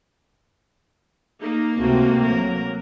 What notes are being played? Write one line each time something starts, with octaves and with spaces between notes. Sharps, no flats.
A#3 D#4
C#2 C3 A3 C4 F#4
F#3 A#4